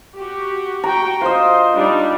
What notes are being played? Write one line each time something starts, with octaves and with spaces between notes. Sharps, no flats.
F#4 G4
F#4 G5 A#5
F4 C5 D#5
G3 D4 D#4